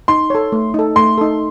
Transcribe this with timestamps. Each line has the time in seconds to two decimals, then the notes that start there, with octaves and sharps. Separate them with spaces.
0.08 D#4 C6
0.30 A4 C#5
0.52 A3
0.74 D#4 A4
0.96 A3 C6
1.18 D#4 A4